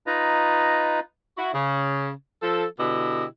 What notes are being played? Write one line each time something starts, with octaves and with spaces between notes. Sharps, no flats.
D#4 F4 B4 D#5 A#5
E4 F#4
C#3
F3 A4
B2 D3 E4 G4 D#5